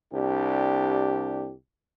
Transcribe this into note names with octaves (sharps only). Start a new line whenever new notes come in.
C2 D4 G4